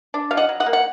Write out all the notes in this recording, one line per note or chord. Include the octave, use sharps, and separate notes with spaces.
D4
F#3 F5
D#5 F#5
F#3
D#5 F#5
A#3
F#5